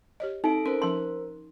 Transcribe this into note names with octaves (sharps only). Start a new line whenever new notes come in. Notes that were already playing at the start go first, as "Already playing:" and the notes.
G4 C#5 D#5
C4 D#4 A4 E5 D7
C#4 A#4 C5
F3 C#4 A5 C6